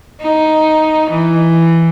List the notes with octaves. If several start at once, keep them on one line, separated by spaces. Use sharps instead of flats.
D#4
E3